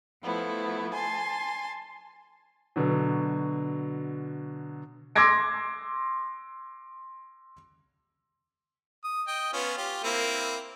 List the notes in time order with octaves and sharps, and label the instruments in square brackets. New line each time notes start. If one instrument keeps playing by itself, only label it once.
[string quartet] F3 A3 B3 E4
G#5 A5 C6
[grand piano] B2 D3 F#3
[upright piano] C6 D6 E6 G#6 A#6 D7
[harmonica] D#6
D#5 G5
B3 C#4 F4
F4 G4
A#3 C4 E4